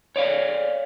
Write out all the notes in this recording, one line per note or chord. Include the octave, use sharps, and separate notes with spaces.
C#5 D5 F5